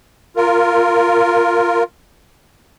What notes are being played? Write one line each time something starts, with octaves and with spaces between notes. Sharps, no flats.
F4 A#4